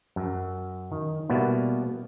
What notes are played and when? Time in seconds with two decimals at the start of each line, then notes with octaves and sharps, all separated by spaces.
0.16 F#2
0.92 D#3
1.29 B2 G3 A#3 B3 E4